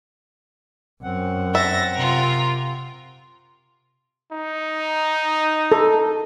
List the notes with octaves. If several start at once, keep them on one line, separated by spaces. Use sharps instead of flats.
F#2 C4 F#5
E5 A6 A#6
C3 F4 A#4
D#4
A4